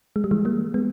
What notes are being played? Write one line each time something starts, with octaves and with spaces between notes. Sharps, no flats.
G#3
G3
E3 G#3
G3 A#3
G#3 B3